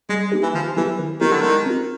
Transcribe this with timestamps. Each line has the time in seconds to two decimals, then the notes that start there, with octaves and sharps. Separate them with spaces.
0.09 G3 G#3
0.32 A#3 D#4 G4
0.43 E3
0.54 D#3 F3
0.76 E3 F#3 B3 E4 G4
0.99 D#3
1.21 D#3 F#3 B3 E4 G4
1.31 D3
1.41 D#3 G#3
1.66 C4 F4